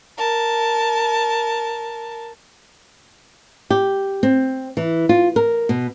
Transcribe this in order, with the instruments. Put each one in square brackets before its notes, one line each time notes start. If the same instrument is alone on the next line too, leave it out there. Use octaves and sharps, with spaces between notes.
[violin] A#4 A5
[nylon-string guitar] G4
C4
E3
F4
A#4
B2